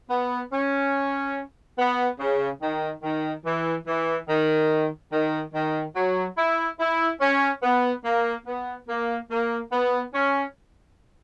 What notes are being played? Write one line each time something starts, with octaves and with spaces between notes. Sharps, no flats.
B3
C#4
B3
C#3
D#3
D#3
E3
E3
D#3
D#3
D#3
F#3
E4
E4
C#4
B3
A#3
B3
A#3
A#3
B3
C#4